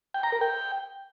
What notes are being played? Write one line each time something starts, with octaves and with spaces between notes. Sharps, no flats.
G5
A#5
A#4
G5